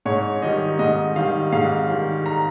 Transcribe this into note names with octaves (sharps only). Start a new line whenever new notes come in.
G#2 C#5
D#3 G3 D#5
G#2 D#5
D#3 G3 F5
G#2 F5
D#3 G3
A#5